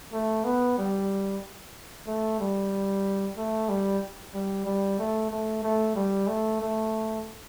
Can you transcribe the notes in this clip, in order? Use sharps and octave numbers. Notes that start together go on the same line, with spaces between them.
A3
B3
G3
A3
G3
A3
G3
G3
G3
A3
A3
A3
G3
A3
A3